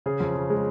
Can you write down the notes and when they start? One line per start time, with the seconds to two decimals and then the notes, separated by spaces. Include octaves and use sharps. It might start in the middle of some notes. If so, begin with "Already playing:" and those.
0.06 C#3 G#4
0.20 F2
0.35 C#3
0.50 G#3